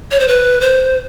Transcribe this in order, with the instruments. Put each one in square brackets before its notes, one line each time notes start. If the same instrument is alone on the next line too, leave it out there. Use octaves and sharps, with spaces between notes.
[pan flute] C#5
C5
B4
C5